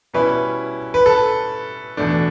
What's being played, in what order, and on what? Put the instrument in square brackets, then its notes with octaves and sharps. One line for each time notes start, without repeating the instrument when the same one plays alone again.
[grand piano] B2 G3 C#4 E4 B4
B4
A4
E2 B2 A3 D4